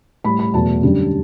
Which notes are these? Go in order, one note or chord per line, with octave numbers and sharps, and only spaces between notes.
A2 G3 B5
B5
E2 B2 F#3 A3 A5
F#2 D3 G3